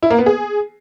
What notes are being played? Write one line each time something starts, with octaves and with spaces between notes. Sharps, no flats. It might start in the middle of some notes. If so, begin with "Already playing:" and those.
E4
A#3
B3
G#4